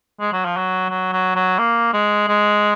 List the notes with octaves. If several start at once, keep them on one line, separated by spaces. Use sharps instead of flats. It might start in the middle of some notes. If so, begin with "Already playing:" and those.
G#3
F#3
F3
F#3
F#3
F#3
F#3
A#3
G#3
G#3